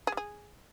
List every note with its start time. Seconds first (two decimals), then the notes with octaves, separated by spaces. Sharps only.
0.07 G#4
0.12 G3
0.17 G#4